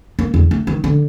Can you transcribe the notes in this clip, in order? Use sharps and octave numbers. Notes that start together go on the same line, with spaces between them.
A#3
E2
A3
D#3
D3